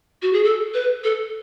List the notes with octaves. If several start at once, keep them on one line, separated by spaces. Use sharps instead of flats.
F#4
G#4
A4
B4
A4